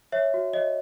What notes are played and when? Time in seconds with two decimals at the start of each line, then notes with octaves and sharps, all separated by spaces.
0.12 C#5 E5
0.34 F#4
0.53 C#5 D#5